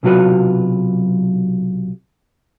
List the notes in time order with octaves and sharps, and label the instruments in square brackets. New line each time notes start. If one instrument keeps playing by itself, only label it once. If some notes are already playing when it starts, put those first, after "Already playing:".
[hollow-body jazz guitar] B1 C3 F#3 F4 F#4 B4